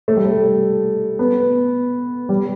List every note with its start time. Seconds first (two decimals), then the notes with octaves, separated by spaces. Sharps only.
0.08 A3
0.16 G3
0.25 A3
1.19 B3
2.29 G3